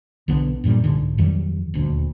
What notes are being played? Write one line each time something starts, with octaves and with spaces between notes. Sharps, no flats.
B1 D3 B3
G2 A#2 F3 G3
C2 G#2 D3
F2 D#3 F#3 G3
D#1 D2